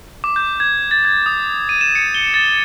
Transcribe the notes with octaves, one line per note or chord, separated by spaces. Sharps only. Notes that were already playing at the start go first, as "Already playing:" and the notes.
D6
G6
G#6
A6
G#6
D#6
D#7
E7
C#7
G7
A6